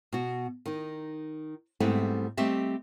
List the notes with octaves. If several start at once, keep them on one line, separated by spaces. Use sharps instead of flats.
B2 F#4
D#3 D#4
G#2 G3 A3 B3 C4 E4
G3 A3 C4 G4 D#5 E5